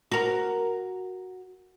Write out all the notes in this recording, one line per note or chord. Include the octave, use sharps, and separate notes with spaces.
F#4 A#4